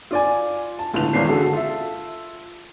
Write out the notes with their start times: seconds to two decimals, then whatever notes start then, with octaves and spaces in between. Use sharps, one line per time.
0.11 F4 D5 G#5
0.79 A5
0.94 G1 C#2 A2 B3 F7
1.13 D#1 G#1 E3 C#4 D5 C7
1.27 D3 F#4 G#4 A4
1.53 F4 A4 E5